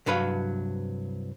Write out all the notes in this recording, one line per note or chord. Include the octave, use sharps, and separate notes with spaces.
C2 G2 F#3 B4 F5